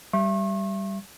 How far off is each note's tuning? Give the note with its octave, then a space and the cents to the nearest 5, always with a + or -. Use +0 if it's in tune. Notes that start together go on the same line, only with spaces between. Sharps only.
G3 +0 E5 +30 C#6 -40